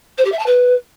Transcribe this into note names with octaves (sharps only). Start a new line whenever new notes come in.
C5
G4
E5
A5
B4